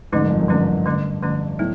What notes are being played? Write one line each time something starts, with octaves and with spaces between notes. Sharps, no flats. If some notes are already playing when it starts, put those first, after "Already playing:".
G#2 D3 F3 A3 C#4
F#2
F2
F#2
G2 D3 F3 A3 C#4
D3 F3 A3 C#4
D3 F3 A3 C#4
A2 F#3 B3